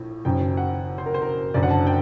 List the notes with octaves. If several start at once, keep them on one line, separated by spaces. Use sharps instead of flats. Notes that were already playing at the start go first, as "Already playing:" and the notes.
Already playing: A#1 A2
F#1 F#2 D#3 G5
F#5
C5
A#4
C5
A#4
F#1 F#2 D3 D5
F#5
A5
G5